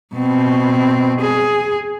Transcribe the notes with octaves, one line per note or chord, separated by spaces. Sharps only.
B2 C4
G#4